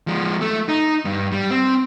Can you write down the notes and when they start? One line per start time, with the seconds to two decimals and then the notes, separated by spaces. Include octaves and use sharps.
0.07 F3 G#3
0.41 A3
0.68 D#4
1.05 G2
1.32 G3
1.51 C4